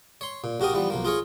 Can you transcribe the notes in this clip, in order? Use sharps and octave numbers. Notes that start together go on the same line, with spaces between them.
C#5 C6
A#2
A#1 F#4 G4 A#4 D#6
E3 F3 G3 B3
B1 F3 A#3
F4 G#4 A#4 C#5